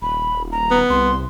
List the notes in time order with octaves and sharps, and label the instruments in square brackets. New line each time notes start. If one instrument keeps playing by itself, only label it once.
[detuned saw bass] D#1 [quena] B5
[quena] A#5
[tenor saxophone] B3
[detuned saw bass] C2 [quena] C6